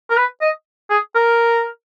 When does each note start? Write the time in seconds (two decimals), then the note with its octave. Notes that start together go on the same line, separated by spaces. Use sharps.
0.10 A#4
0.17 B4
0.41 D#5
0.90 G#4
1.15 A#4